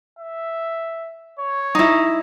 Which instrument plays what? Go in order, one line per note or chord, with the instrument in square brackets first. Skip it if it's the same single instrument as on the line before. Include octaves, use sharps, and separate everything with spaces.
[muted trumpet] E5
C#5
[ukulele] D#4 E4